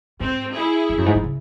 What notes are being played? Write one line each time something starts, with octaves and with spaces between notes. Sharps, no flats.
G#2 C4
E4 G#4
G#2
F#2
G#2
D#3
C#3